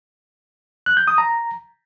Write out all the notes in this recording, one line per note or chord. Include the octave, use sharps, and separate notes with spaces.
F#6
G6
D#6
A#5